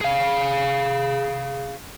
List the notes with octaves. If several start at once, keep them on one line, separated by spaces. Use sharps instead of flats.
G#4 F5